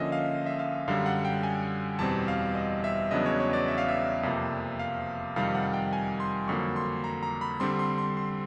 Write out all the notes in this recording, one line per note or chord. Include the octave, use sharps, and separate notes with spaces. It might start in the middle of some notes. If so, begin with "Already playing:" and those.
Already playing: D3 F3 A#3 C#4 D#5 E5
F5
E5
F5
F#2 D3 G3 F5
F#5
G5
G#5
E2 B2 G3 C4 A5
F5
D#5
E5
E2 C#3 F#3 B3 D4 D#5
C#5
C#5
D5
E5
F5
E5
F2 C3 F3 A#3
F5
F2 C3 D#3 G3 F5
F#5
G5
G#5
C6
F2 D3 F#3 A#3 C#6
C6
A#5
A#5
B5
D3 G3 C4 C6
C6
C6
C6